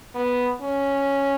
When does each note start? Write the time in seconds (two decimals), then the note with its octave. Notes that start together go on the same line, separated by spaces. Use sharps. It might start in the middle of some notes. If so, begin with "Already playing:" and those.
0.15 B3
0.62 C#4